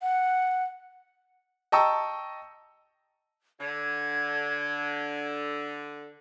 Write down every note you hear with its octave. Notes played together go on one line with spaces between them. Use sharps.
F#5
D#5 G5 A5 A#5 C#6 E6
D3 G#6